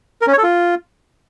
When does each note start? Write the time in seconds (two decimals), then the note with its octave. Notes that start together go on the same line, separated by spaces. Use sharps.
0.22 A#4
0.27 C#4
0.32 C#5
0.38 A4
0.43 F4